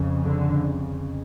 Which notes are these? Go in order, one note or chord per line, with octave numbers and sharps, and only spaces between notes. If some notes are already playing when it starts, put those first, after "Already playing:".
Already playing: F2 C#3
D3